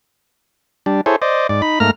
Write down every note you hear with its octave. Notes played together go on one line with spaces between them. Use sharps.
G3 D4
E4 G#4 A4 C5 C#5
C5 D5 D#5
G#2 D5
D#4 B5
G#2 A3 A#3 A#5 F6